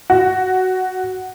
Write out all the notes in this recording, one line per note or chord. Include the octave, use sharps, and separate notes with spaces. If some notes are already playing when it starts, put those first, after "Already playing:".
F#4